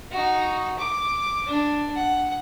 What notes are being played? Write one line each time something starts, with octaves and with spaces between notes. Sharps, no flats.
D#4 F#4
D6
D4
F#5